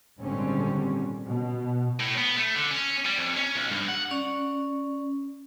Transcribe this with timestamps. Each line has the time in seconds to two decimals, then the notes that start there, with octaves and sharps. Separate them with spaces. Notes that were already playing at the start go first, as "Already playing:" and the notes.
0.21 G#1 A#2 D3 G3 C4 C#4
1.25 B2
2.00 A2
2.18 B3
2.37 A3
2.56 D3
2.71 C#4
3.06 G3
3.18 F2
3.36 C#4
3.56 B1
3.72 G2
3.88 F#5
4.11 C#4 D5